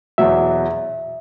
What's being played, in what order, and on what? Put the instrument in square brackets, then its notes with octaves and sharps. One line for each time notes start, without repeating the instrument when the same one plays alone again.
[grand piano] E2 B2 F#3 [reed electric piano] E5